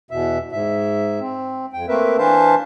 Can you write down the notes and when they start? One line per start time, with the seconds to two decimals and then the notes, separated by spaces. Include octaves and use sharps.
0.11 E2 B2 E5
0.52 G#2 E5
1.20 C4
1.73 F2 G5
1.88 A3 A#3 C4 A#4 B4 E5
2.18 E3 D4 B4 C5 F5 A5